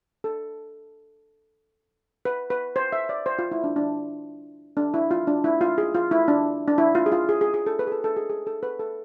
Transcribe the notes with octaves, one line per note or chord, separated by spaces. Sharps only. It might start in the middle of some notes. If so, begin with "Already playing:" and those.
A4
B4
B4
C5
E5
D5
C5
F4
E4
D4
D4
D4
E4
F4
D4
E4
F4
G#4
F4
E4
D4
D4
E4
F4
G#4
F4
G#4
G#4
G#4
A4
B4
G#4
A4
A4
G#4
G#4
A4
B4
A4